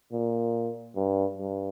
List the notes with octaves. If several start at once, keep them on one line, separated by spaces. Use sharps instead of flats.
A#2
G2
G2